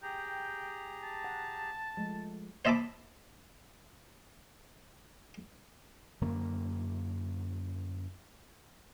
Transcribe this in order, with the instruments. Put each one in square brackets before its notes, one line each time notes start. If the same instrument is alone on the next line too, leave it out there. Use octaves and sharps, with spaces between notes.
[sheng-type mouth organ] G4 G#4 A#5 [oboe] G5
[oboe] A5
[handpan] F#5
F3 G#3 A3
[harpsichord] C5 D#5 E5 A5 B5 D6
[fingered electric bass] F#2 D3 A#3